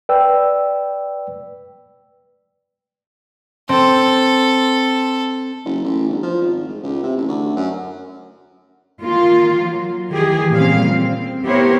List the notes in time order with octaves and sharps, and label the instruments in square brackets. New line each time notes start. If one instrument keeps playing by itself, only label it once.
[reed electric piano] B4 D5 G5 E6
[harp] C4 [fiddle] A4
[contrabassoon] F#1
A1
G1
F3
G#1
G#2
C#2
C3
A1
D2
F#2
[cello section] D#3 A#3 F4
F#3
D#3 E3 G4 G#4
A#2 C#3 F3 G3 C4 F5
C4
B3 E4 G4 A#4 C5 C#5